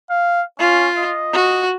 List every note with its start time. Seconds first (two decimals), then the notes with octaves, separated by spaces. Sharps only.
0.10 F5
0.60 C#4 F4
0.97 D#5
1.33 F#4